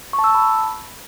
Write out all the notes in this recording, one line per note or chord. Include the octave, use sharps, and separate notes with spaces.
C#6
A5
E6
A5
B5